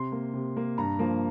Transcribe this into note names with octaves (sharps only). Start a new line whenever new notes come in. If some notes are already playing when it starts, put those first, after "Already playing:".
Already playing: C3 C6
A#3
C3
A#3
G2 A#5
F3 A#3